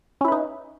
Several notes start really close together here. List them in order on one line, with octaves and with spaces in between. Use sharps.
C#4 E4 B4 D#4